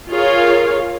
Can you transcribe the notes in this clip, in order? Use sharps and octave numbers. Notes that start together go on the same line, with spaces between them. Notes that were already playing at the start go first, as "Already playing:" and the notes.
F4 G#4 A#4 C#5 F5